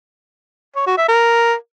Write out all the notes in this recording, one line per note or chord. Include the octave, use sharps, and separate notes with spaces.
C#5
F#4
E5
A#4